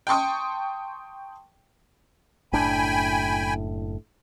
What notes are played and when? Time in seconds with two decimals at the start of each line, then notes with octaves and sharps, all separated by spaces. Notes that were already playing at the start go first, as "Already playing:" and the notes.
0.07 G5 A5 C6 C#6 D#6
2.53 F#1 A2 D4 G5 G#5 B5